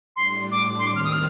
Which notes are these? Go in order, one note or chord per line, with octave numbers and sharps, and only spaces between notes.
A2 G3 D4 C6
D6
C6
D#2 D#3 G3 C4 D6
F6
D#6
F6